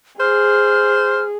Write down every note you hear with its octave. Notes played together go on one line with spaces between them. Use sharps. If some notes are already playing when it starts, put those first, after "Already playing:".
G#4 C5 F6